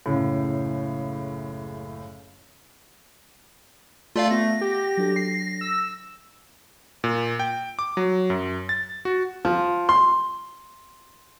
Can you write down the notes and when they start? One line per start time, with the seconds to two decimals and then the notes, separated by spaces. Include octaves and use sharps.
0.06 F#1 C#2 F#2 A2
4.16 A3 F4 D5 F5
4.31 B3 F4 F#5 A#6
4.61 G4
4.97 F#3 D4 A4
5.16 C7
5.61 E6
7.04 A#2
7.40 G5
7.79 D6
7.97 F#3
8.30 F#2
8.69 A6
9.05 F#4
9.45 F3
9.89 C6